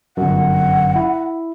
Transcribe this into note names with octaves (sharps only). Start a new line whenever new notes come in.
G1 F#2 F#5
E4